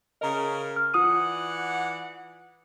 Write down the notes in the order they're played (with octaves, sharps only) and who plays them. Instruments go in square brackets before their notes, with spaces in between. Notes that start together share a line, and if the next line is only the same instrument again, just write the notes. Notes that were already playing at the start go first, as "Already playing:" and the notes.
[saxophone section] C#3 A#4 [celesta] D#5 A#5
[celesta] F6
[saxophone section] E3 D5 F#5 [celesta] F4 D#6 D#7